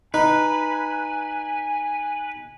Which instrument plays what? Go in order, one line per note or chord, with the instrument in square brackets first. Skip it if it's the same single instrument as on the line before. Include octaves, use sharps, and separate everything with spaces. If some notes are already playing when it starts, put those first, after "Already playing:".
[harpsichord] D#4 [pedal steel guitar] B4 [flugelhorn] G#5